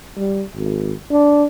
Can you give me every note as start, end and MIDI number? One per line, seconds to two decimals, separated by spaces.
0.17 0.43 55
0.56 0.93 32
1.10 1.46 62